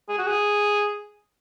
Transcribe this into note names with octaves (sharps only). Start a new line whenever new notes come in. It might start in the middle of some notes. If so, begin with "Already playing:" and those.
G#4
F#4
G#4